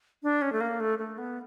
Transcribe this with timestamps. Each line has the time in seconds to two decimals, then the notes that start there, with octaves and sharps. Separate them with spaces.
0.23 D4
0.42 C#4
0.53 A3
0.61 A#3
0.80 A3
0.99 A3
1.18 B3